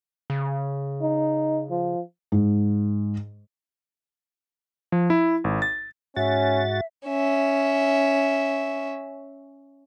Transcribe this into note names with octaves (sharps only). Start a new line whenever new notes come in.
C#3
D#4
F3
G#2
F3
E4
G#1
A6
G#2 C#4 F#4 E5 A6
C#4 E5